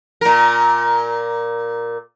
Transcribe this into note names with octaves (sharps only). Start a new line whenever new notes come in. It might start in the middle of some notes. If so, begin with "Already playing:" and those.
A#2 A#4